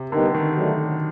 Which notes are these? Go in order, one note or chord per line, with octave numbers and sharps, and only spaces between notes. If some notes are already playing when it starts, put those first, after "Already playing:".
Already playing: C3
D3 G3 B3 D#4 G4 A#4
D#3
F#3 A3 D4 F#4 A#4